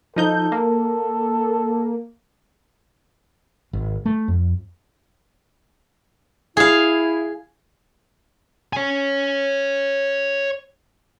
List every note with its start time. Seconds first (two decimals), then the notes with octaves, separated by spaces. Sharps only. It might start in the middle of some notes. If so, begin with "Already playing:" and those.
0.16 F3 D#4 A4 G6
0.52 A#3
3.73 G#1
4.06 A3
4.28 F2
6.57 E4 G#4 F5
8.73 C#5 G#5